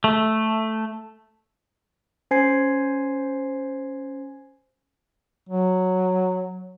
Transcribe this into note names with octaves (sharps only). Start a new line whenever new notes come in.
A3
C#4 C5 G#5 G#6 C7
F#3